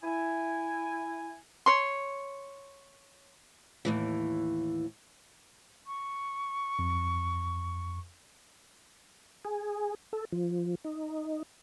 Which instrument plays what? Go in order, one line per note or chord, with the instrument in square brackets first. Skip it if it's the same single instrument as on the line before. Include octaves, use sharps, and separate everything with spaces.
[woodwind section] E4 G#5
[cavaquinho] C#5 C6
[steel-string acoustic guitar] D#2 A2 E3
[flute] C#6
[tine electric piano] F2
[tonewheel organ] G#4
A4
F3
D#4